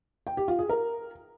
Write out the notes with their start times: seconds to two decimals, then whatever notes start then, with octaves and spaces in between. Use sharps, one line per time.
0.27 G5
0.37 G4
0.48 F4
0.59 G#4
0.69 A#4